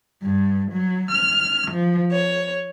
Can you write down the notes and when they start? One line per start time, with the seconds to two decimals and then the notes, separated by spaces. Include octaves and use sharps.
0.22 G2
0.72 F#3
1.11 F6
1.72 F3
2.13 C#5